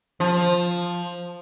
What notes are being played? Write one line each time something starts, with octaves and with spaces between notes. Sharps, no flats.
F3